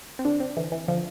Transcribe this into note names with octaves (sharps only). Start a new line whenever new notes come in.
C4
D3 D4
C4
D3 E3
E3
D3 F3